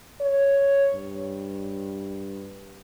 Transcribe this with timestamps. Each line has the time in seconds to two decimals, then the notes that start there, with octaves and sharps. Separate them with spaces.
0.21 C#5
0.94 G2